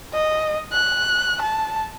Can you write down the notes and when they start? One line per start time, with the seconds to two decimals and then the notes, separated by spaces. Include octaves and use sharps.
0.13 D#5
0.72 F#6
1.42 A5